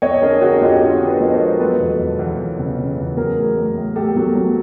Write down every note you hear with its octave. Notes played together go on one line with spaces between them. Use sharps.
F2 C#5 D#5
D3 G#4 A#4
D3 F#4 G#4
F2 F4 G4
D3 G4 A4
D3
A4 B4
F3
A#4 C5
G#3
F#3 A4 B4
E2
E2
E2
E2
C#3
C#3
E2
F#3 G#4 A#4
A2
A2
A2
A2 G4 A4
F#3
F#3